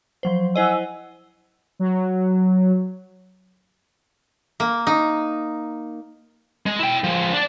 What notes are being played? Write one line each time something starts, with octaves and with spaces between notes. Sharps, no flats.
F3 F#3 C5
E4 C5 D#5 F#5 G#5 E6
F#3
A#3
D#4
G#3
E4 G5
F3 G#3
D4 D5